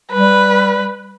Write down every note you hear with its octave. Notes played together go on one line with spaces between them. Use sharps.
G3 B4